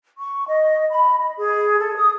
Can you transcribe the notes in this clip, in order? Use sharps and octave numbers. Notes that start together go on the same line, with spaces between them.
C#6
D#5
B5
D#5
G#4
A4
D#6